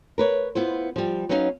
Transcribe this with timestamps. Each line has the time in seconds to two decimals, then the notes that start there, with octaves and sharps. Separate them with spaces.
0.18 A#4 B4 C#5
0.55 B3 E4 F4 C5
0.96 F3 G3
1.29 F#3 B3 C#4 D#4 C#5 F5